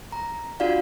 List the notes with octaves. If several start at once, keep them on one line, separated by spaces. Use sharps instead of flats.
A#5
D4 F4 F#4 D5 F5